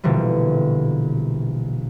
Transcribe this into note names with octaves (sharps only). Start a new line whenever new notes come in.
A#1 B2 D3 E3 G3